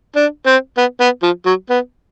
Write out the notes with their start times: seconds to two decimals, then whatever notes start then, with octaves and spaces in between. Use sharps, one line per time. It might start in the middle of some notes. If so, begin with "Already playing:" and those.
0.16 D4
0.46 C4
0.77 B3
1.00 B3
1.22 F3
1.46 F#3
1.69 B3